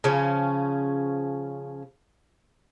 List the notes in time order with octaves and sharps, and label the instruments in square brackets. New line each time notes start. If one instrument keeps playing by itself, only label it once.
[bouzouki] C#3 F3 C#4